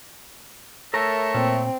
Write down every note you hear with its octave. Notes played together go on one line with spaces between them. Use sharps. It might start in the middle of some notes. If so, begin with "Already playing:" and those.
A3 A4 A#4 C#5 E5 A#5
A#2 C4